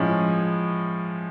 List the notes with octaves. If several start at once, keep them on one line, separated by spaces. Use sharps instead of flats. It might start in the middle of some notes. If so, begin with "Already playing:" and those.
Already playing: A2 F3 G#3 C#4